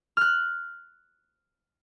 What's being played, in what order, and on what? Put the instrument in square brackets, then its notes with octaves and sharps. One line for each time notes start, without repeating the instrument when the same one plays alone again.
[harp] F6 F#6